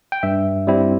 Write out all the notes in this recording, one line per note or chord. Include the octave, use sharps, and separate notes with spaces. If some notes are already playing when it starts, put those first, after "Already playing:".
G5
G2 E5
G3 C4 E4